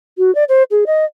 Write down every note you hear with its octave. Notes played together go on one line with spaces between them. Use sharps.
F#4
D5
C5
G#4
D#5